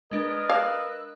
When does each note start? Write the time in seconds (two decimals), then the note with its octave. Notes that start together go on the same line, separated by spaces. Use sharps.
0.11 G#3 D4 A#4 B4 D#5
0.50 F5 E6 F#6